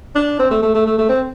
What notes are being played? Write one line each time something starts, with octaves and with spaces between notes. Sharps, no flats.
D4
C4
A3
A3
A3
A3
A3
C4